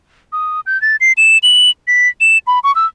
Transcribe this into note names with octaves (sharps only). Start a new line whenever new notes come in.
D#6
G6
A6
C7
E7
F#7
B6
E7
B5
C#6
E6